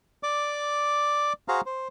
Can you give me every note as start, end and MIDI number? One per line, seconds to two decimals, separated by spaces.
0.23 1.33 74
0.23 1.33 86
1.48 1.61 66
1.48 1.61 68
1.48 1.61 72
1.48 1.61 77
1.48 1.61 82
1.66 1.88 72